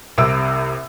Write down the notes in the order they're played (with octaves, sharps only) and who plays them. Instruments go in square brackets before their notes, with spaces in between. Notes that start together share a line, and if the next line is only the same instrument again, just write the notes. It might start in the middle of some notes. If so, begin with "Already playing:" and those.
[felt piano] C2 C3 E6 D7